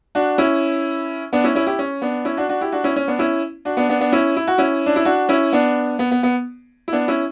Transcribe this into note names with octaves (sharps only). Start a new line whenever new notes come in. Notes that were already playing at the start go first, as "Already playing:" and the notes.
D4 F#4
C#4 E4
B3 D4
C#4 E4
C#4 E4
E4 G4
C#4
B3 D4
C#4 E4
D4 F#4
D4 F#4
E4 G4
D4 F#4
C#4 E4
C#4
B3 D4
C#4 E4
D4 F#4
B3 D4
B3 D4
B3 D4
C#4 E4
E4
F#4
C#4 E4
D4
E4
D4 F#4
C#4 E4
B3 D4
B3
B3
B3
E4
B3 D4
C#4 E4